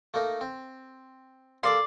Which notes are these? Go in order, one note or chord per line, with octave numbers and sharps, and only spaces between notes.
A3 A#3 D#4
C4
A#3 A4 D5 C6